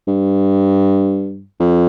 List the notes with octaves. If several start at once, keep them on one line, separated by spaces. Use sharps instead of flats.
G2
F2